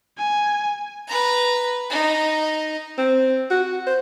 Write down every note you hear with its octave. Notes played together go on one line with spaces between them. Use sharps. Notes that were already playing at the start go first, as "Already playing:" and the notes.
G#5
B4 A#5
D#4
C4
F#4
C5